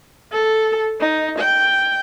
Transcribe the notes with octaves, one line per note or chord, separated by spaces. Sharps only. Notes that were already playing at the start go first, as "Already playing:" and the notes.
A4
D#4
G5